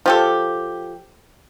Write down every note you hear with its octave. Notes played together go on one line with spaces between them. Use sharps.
F3 G4 A4